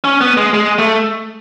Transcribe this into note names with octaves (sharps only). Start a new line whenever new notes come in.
C#4
B3
G#3
G#3
A3